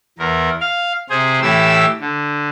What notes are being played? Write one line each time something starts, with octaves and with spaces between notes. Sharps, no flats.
E2 A#4
F5
C3 G#4 C5
A2 E3 E4 G4 E6
D3